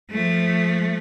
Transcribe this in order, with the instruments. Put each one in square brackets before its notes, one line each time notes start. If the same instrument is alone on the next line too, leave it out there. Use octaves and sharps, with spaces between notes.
[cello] F3 A3